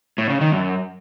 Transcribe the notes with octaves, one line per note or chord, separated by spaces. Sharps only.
A2
C#3
D#3
F#2